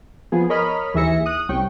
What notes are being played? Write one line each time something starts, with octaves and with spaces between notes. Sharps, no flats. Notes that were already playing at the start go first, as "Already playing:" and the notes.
F3 B3 G#4
A#4 C#5 D#5 B5 F6
D#2 E3 G#4 E5 A#6 C#7
D#6 F#6
C2 G3 C#4 G5 C#6